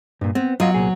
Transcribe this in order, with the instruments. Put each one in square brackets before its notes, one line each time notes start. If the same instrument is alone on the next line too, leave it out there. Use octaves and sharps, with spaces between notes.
[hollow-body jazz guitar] G2 A#2
[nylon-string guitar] B3 [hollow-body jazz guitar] C4
[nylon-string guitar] F#3 [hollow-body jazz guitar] F4 D#5 F5
[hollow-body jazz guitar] C2 A#2 G#4